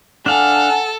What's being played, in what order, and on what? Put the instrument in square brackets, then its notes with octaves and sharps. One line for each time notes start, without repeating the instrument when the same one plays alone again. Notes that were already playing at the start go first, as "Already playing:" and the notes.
[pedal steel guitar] D4 F5 [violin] A4 [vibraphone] F#5 G#5 A5